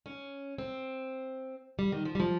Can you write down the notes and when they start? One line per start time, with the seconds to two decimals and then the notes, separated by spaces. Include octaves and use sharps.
0.06 C#4
0.58 C4
1.79 G3
1.92 D#3
2.05 F3
2.15 G3
2.20 F3